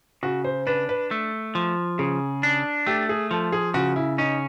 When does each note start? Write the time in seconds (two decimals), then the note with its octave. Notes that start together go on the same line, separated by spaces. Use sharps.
0.23 C#3 F#4
0.44 C5
0.67 D4 B4
0.89 B4
1.11 A3
1.55 F3
1.99 C#3 G#4
2.43 D4
2.87 A3 G4
3.09 G#4
3.31 F3 A4
3.52 G#4
3.74 C#3 F#4
3.96 E4
4.18 C#4 D#4